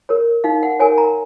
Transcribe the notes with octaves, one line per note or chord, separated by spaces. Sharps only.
A#4 C#5
D#4 F5
F#5
A#4 C#5 G#5
A#5